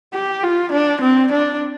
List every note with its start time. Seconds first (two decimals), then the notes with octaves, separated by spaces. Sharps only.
0.14 G4
0.43 F4
0.72 D4
1.01 C4
1.32 D4